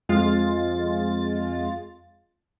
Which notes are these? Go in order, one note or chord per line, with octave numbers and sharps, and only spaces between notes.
F2 G#3 F4 A6